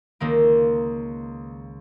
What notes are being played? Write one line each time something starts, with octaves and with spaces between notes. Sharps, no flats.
C#2 D#3 A#3